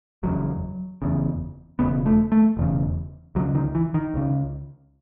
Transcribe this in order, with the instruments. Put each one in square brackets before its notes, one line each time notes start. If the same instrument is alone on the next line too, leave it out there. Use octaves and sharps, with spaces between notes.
[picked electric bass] F#1 E2 C#3 F#3
F#1 E2 C#3
E1 E2 C#3 B3
A3
A3
E1 E2 C#3
C#2 F#3
C#3
D#3
E3
D#3
C#2 C#3